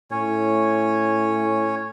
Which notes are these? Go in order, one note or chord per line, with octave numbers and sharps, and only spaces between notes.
A2 C#4 C#5